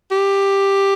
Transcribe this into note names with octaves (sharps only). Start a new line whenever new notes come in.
G4